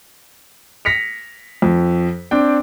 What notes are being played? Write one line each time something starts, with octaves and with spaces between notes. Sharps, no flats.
A#6 B6 C#7 F7
F2
C4 D4 G5